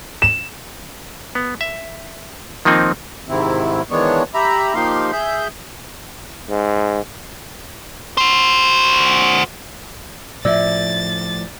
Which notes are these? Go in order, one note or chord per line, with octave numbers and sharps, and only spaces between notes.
E7
B3
E5
D#3 F3 A#3 C4 D#4
G#2 C3 D#3 C4 E4
D#3 E3 G#3 B3 D4 C#5
G4 E5 A#5 B5
F3 A#3 D#4 G4 F5 C6
G#4 E5 G6
G#2
F#4 C5
A2 F3 D5 E5 E6 A6